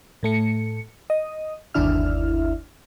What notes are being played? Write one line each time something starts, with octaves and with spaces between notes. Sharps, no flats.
A2 A3 C#7
D#5
G1 D#2 D4 E4 E5 F6